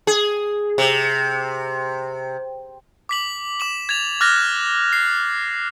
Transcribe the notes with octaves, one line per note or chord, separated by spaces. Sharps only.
G#4
C3
D6 B6 F#7
D6 E7 F#7
G#6 A6 F7
D6 F6 F#6 A6 A#6
C7